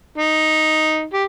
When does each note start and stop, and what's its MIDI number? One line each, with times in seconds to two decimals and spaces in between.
0.18 1.05 63
1.14 1.24 67